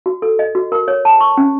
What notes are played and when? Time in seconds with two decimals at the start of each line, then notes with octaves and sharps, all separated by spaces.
0.06 F#4
0.22 A4
0.39 D#5
0.55 F#4
0.72 A#4
0.88 C#5
1.05 A5
1.20 C#6
1.37 C#4